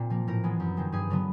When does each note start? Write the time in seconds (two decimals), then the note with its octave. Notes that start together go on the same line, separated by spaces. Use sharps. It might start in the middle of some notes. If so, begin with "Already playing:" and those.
Already playing: A#2 C4
0.10 F3 A#3
0.27 A2 A#4
0.43 E3 G#3 B3
0.60 F#2
0.77 D#3 G#3 C4
0.92 G2 G#4
1.10 D3 F#3 B3